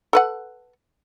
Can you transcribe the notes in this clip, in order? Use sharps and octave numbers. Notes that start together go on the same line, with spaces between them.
A4 B4 F#5